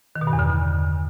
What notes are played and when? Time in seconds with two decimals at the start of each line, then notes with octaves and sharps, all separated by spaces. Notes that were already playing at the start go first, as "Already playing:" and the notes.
0.16 D#3
0.21 B2
0.27 G2
0.33 E2
0.39 D3